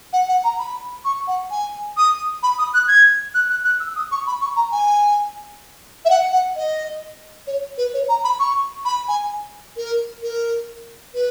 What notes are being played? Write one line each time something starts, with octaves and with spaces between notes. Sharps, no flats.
F#5
F#5
A#5
B5
C#6
F#5
G#5
D#6
B5
D#6
F#6
G#6
F#6
F#6
F#6
E6
D#6
C#6
B5
C#6
A#5
G#5
E5
F#5
F#5
D#5
C#5
B4
C#5
A#5
B5
C#6
B5
G#5
A#4
A#4
B4